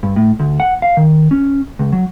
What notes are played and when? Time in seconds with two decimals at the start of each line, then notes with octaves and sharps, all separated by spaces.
0.03 G2
0.16 A2
0.39 D2
0.60 F#5
0.82 F5
0.97 D#3
1.31 C#4
1.79 C#2
1.92 F#3